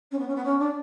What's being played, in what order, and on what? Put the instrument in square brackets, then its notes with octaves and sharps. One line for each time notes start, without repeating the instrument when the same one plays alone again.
[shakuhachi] C#4
B3
C#4
B3
C#4
D4